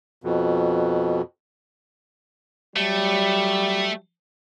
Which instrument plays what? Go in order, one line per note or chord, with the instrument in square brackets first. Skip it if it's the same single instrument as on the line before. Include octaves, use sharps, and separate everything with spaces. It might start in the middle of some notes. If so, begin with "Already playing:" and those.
[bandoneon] F2 B2
[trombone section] F#3 G3 [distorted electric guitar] A3